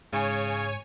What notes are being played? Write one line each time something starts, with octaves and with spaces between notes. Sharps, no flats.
G#2 C#3 C#5 G#5